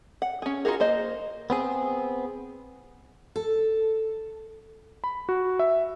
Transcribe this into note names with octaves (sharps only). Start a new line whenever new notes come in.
F#5
C#4 G#4
D#4 F4 F#4 G#4 A#4
A#3 C5 D#5
B3 C4 G#4
A4
B5
F#4
E5